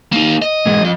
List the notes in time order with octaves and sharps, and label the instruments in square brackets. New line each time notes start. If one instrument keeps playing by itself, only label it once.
[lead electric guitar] A#3 D#4
D#5
[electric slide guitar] G#2 E3 G#3
F3 D#5